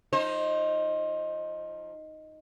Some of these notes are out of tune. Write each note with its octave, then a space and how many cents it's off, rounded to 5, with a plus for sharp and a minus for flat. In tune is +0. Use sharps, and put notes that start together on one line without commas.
F3 -10 D#4 +0 C5 +25